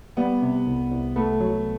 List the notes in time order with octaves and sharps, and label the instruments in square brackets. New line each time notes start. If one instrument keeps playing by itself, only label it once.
[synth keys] G3 [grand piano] B3
[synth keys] C3
C2
C2
[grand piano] A3 [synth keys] B3
[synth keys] F#3